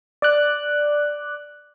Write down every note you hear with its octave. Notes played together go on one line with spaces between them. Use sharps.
D5 D6 F#6